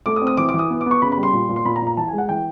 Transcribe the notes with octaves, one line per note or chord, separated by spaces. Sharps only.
A3 D6
D#6
C4
D#6
E3 D6
D6
E3
D#6
B3
D6
B3 C#6
C#3 B5
B5
G3
C6
A#2
A#2
C6
A#2 B5
A#5
A#2
A#5
E3 A5
G#5
G#3
F#5
E3 G5